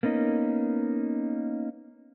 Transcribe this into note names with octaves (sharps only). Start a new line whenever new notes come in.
A#3 B3 C#4 D#4